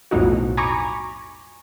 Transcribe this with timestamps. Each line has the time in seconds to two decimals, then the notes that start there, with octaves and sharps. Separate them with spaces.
0.11 B1 F2 A2 D#4 F#4
0.57 G#5 A#5 B5 C#6 D6